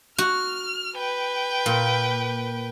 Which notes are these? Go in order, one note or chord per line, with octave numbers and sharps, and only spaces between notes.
F#4 F6
B4 G5
A#2